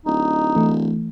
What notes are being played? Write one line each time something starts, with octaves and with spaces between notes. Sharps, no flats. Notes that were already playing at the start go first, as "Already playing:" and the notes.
D1 D#4
E3 A3